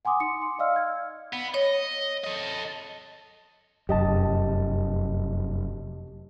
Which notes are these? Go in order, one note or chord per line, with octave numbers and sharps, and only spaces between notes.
F#5 G#5 C6 D6 D#6
D#4 C#7
C6
D5 D#5 F5 E6 F6
F6 G#6
B3
C#5 D#5
A4 D#5
F1 F#2 G4 D#5 A5